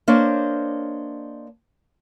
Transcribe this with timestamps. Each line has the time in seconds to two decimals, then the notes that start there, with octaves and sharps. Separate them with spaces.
0.08 A#3 D4 C5 C#5 D#5